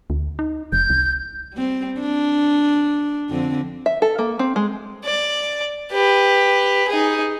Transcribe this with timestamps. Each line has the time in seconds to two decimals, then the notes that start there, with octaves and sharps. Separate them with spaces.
0.10 D2
0.39 D#4
0.72 F1 G6
0.90 C2
1.53 G3 C4
2.00 D4
3.30 F2 D3 C4
3.86 E5
4.02 A4
4.19 A#3
4.39 C4
4.56 G#3
5.05 D5
5.92 G4 B4
6.88 D#4 G#4